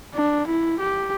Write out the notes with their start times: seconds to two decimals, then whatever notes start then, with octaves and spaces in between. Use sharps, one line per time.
0.15 D4
0.47 E4
0.80 G4